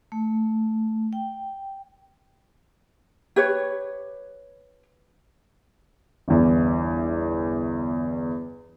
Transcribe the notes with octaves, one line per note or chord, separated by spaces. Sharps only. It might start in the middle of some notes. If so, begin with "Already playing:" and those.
A3
G5
G4 B4 C#5
G1 E2